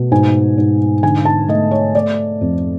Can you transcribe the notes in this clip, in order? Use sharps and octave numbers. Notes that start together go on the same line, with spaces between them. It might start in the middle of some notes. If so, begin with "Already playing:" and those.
Already playing: B2 A3
G#2 G#5
G#2
D3 G#5
A5
A3 D#5
C#5
A3 D5
F2